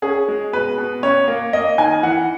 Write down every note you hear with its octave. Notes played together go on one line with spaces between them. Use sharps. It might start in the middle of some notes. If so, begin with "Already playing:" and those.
C#4 G#4
G#3
B2 B4
B2
C#4 C#5
A#3
A#3 D#5
D#3 G#5
E3 F#5